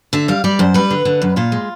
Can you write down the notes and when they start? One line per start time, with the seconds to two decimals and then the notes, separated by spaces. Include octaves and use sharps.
0.13 D3 E5
0.28 G3 F5
0.44 G3 D5
0.59 F#2 C5
0.74 G3 B4
0.91 D3
1.05 D3
1.22 F#2
1.36 A#2 F4
1.52 G#3